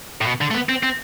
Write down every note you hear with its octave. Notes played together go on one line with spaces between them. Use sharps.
A2
B2
D3
A3
B3
C4
C4